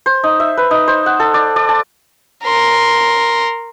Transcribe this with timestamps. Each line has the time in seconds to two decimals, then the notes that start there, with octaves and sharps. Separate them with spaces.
0.06 C5
0.24 D#4
0.40 E5
0.57 B4
0.71 D#4
0.88 C5
1.06 F#5
1.20 A4
1.34 D5
1.56 D5
1.69 A5
2.44 A#4 C6